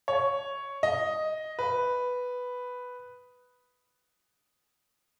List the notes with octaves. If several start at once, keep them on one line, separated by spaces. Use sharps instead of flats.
C#5
D#5
B4